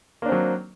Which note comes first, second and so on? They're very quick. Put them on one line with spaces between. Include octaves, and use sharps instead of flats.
A#3 D4 C4 F#3